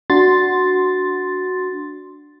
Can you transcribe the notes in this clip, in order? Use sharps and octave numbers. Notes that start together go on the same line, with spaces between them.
D4 F#4 C6 A6